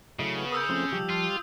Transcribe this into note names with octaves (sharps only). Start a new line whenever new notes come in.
C#3 F#3 A3 E4 D#5
B3
A#4 D#6 E6 G6
F3 A3 C4 C#4 C6
F3 G3 G4 A5
F4